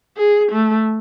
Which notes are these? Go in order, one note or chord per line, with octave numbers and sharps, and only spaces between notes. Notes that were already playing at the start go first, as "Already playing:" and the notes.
G#4
A3